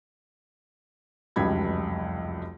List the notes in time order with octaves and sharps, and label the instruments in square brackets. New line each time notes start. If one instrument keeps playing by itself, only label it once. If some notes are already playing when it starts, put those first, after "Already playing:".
[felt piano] F1 C#2 F#2 G3 B5 G#6